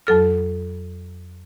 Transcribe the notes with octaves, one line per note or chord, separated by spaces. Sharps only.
F2 F#3 A4 F6